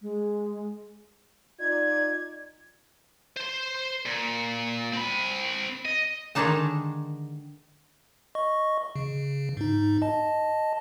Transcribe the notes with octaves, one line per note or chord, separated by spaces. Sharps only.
G#3
D#4 F4 D5 G#6
C5 C6
A#2
C4 B5
D#5
D3 D#3 G#3 D4 D#4 A5
D#5 C#6
C#3
G#2 D#4
D#5 A5